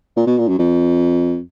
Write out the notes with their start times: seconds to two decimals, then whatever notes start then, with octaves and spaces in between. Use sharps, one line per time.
0.17 A#2
0.27 B2
0.38 A#2
0.48 F#2
0.58 F2